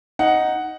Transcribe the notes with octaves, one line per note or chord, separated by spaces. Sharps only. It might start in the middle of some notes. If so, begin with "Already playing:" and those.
D#4 F#5